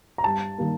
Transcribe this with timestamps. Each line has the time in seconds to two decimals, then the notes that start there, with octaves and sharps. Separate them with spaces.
0.18 A#5
0.24 G2 A5
0.58 D#3 G3 A#3